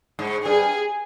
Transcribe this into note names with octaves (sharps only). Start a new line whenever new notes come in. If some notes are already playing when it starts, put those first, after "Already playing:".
G#2
G2 G#4